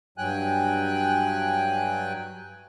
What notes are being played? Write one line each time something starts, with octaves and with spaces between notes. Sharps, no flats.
G2 F#3 G5 G#5 F#6